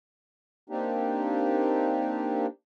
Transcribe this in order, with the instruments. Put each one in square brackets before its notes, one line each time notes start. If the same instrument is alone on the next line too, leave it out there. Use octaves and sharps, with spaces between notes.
[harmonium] A#3 C4 D4 D#4 G4